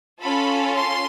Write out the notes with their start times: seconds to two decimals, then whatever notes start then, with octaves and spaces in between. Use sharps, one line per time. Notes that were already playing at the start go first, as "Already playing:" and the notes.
0.21 C#4 F4 A4 B5
0.75 C6